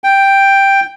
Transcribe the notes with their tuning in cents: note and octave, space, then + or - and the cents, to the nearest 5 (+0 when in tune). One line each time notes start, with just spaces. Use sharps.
G5 +5